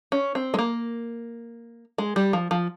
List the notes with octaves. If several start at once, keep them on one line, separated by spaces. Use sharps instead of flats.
C#4
C4
G#3
A#3
G#3
G3
F3
F3